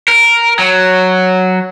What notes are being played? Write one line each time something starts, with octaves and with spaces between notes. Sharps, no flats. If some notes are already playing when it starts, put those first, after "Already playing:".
A#4
F#3